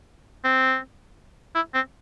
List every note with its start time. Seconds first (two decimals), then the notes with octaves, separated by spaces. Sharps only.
0.44 C4
1.55 E4
1.74 C4